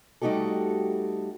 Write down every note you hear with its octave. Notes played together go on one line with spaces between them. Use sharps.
G3 A3 D#4 F#4 G4 A4